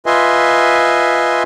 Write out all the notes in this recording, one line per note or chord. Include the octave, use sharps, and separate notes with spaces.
F4 B4 D#5 E5 G#5 C6